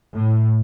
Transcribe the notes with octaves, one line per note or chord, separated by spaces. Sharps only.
A2